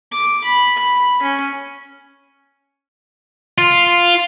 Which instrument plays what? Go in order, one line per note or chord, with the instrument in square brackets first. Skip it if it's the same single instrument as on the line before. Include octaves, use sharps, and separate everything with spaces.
[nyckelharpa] D6
B5
B5
C#4
[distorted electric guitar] F4